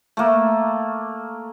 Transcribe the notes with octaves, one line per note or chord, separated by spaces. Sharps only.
A3 A#3